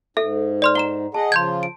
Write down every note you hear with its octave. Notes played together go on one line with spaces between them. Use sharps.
G#2 A4 E5
D5 C6 F6
F#5 A#5 E7 G7
G#4 D#5 F#5 A5
C#3 F3 F4 C6 G6 G#6
D7